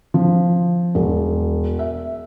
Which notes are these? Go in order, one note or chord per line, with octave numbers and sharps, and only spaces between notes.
F3
E1
E5